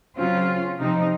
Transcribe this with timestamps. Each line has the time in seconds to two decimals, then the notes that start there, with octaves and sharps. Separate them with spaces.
0.17 C#3 F#3 C4 C#4 F4
0.78 C3 F3 C4 D#4